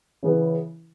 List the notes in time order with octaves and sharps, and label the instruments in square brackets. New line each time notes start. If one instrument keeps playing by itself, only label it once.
[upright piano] C#3 E3 B3 E4